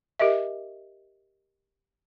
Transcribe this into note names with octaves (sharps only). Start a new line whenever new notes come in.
G4 A#4 D#5 E5